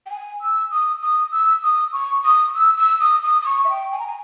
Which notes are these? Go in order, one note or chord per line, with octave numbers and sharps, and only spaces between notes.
G5
G#5
E6
D#6
D#6
E6
D#6
C#6
D#6
E6
E6
D#6
D#6
D#6
C#6
E5
G5
G#5
A#5
G#5